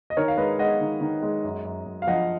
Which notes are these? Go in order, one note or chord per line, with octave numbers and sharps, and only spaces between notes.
D#5
D#3 A#4 C#5
F5
G#3 B4 D#5
G#3 D#5 F#5
D#3
D#3
G#3
F#2
F#2
F#2
F5
F3 D#5 F#5